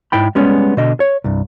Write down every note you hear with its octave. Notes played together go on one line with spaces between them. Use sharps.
G#2 E4 G5 B5
G3 G#3 B3 C#4
B2 D3 D#5
C#5
C2 G2